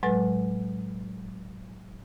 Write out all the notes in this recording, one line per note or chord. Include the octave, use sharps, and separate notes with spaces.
A2 F#3 G#3 B4 A6